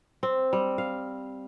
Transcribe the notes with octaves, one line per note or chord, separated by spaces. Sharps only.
C4
G3
F5